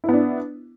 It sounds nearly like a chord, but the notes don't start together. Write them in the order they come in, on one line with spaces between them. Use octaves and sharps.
E4 B3 D4